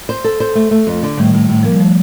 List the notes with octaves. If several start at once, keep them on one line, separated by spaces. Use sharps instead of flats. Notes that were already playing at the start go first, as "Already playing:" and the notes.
C5
A4
C5
A3
A3
F2
D3
A2 D#3 G3
A2
A2
F3 A#3
G3
F3 A3